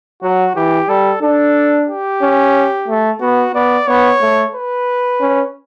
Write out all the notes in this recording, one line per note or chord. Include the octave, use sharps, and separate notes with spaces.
F#3 F#4
E3 G4
G3 A4
D4 A4
G4
C#4
A3
B3 F#4
B3 D5
B3 C#5
A3
B4
C#4